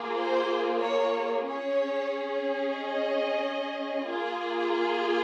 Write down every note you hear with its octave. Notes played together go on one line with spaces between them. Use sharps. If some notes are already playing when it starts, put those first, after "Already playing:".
Already playing: A#3 F4 G#4
C5
C#5
C#4 G#4 C#5
D#5
A#3 F4 G#4